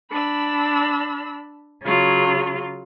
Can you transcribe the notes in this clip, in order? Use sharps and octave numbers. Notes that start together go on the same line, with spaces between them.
D4 B5 E6
C#3 F#3 F4